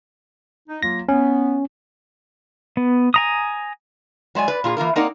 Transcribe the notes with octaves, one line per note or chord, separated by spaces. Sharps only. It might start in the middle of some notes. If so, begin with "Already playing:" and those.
D#4
F#3 A#3 F4 A#6
B3 C#4
B3
G#5 A#5 D#6
F#3 G#3 D5 G#5
B4 D5
A#2 F4 G#4
E3 A#3 F4 A#4
A#3 C4 D#4 A#4 D5 F#5